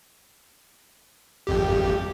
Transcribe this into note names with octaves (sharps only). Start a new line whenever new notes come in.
G#1 F2 G4